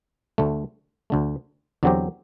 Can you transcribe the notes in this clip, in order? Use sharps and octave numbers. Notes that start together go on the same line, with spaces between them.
D2 D3 A3
D2 D3 A3
E2 D3 F#3 C4 G4